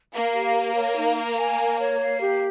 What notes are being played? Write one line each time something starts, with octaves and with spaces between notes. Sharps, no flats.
A#3 F5
G4
A#4
C#5
D#4
A#4
G#5
A#4
C#5
F5
G4